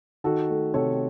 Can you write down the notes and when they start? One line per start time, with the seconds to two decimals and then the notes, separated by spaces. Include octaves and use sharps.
0.24 D#3 F#4 A4
0.50 A3
0.74 C3 A4 C#5